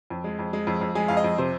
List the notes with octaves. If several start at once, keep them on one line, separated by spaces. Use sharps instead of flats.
F2
G#3
F2
G#3
F2
F2
G#3 G#5
F2 F5
D#5
F2
C3 C5